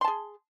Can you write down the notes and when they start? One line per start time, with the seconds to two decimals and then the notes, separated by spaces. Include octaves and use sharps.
0.01 C6
0.04 A5
0.08 G#4